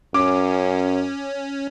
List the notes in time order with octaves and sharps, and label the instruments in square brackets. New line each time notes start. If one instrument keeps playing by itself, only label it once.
[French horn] F#2 [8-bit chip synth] C#4 [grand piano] D6